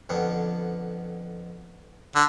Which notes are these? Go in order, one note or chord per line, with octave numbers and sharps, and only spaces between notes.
F2 D3 B3
D3